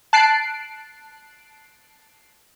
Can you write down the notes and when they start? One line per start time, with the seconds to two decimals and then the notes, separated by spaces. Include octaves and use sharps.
0.13 A5 F#6 C7 D7